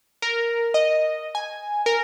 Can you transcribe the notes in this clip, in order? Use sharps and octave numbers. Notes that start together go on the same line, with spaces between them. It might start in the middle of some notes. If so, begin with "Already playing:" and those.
A#4
D#5
G#5
A#4